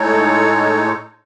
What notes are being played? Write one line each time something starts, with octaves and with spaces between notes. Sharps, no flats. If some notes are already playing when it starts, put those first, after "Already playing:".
Already playing: A2 G#3 D#4 A4 C#5